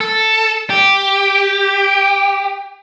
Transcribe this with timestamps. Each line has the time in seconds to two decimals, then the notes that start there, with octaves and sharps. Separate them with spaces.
0.01 A4
0.70 G4